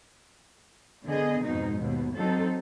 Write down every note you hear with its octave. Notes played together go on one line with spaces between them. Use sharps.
D3 B3 G#4 D#5
F2 G#2 B2 D#4
D#2 B2 B3
F#3 C4 D#4 A4